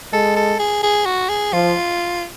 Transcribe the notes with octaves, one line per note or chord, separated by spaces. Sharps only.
G#3 A4
A4
G#4
G#4
F#4
G#4
F3 F4